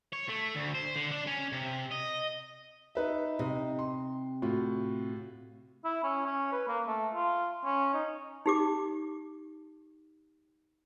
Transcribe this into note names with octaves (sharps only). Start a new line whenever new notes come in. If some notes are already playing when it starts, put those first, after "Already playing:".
C#5
A3
D2
C5
D3
D4
C#4
C3
D#5
D#4 B4 E5
C3 D#4
C6
A2 F4 F#4
E4
C#4
C#4
B4
A#3
A3
F4
C#4
D#4
D#4 G4 D6